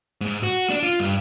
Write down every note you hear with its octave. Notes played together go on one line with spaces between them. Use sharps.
G#2
F#4
D4
F4
G2